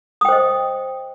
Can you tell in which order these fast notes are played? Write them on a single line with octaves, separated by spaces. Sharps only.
D#6 G5 C5 D#5